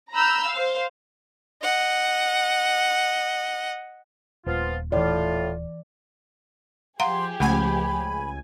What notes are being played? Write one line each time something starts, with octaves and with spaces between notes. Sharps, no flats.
A#5 B5 E6 F6 G6
C5 F5
D#5 F#5
D#1 F3 B3 F4
A2 E3 F4 D5
F3 G4 G#4 F5 F#5 A#5 C6
C#2 A3 F#5 G#5 B5